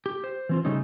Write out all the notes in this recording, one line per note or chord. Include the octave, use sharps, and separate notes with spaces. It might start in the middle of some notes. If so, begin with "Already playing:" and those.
G4
C5
E3 C4 F4
C#3 G3 A3 C#4 D#4